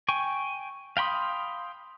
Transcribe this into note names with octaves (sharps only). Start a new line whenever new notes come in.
G5 G#5 C#6
F5 G5 B5 C6 D#6